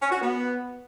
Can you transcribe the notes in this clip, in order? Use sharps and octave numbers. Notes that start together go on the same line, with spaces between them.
C#4
F#4
B3